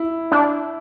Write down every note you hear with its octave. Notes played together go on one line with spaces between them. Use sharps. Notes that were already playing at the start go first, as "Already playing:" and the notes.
Already playing: E4
D4